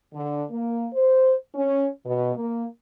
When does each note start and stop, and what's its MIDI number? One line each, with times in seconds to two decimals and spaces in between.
0.14 0.41 50
0.50 0.86 58
0.93 1.33 72
1.55 1.86 61
2.04 2.33 47
2.35 2.64 58